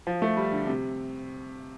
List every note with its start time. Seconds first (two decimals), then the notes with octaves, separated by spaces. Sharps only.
0.07 F3
0.22 A3
0.37 G3
0.52 D3
0.67 C3